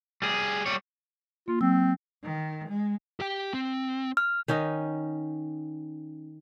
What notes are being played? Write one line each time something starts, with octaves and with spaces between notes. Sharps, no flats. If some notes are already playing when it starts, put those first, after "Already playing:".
G3 G#4
G3 C#5
A#3 F4
F#3 C4 E6
D#3
G#3
G4 G5
C4
F6
D#3 C#4 D#4 D#5